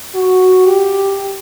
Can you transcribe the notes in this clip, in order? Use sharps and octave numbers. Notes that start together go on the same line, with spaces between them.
F#4
G4